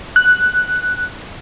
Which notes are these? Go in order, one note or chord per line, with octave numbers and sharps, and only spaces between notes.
F#6